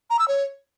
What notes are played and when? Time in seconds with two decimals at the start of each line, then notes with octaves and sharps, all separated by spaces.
0.10 A#5
0.19 E6
0.28 C#5